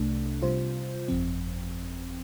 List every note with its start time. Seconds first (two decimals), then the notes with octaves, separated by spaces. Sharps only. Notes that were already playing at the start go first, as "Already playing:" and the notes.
Already playing: C2 C3 A3 D4
0.42 C3 G3 F4 C5
1.08 G1 F2 F3 C4